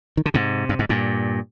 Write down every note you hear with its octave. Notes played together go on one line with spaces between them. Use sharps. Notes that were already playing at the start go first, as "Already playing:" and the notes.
D#3
D3
G#2 C3
G2
G#2
G2 A#2